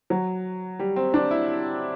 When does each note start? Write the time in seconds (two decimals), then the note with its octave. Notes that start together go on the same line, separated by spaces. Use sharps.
0.10 F#3
0.79 G3
0.96 C4
1.14 D4
1.31 E4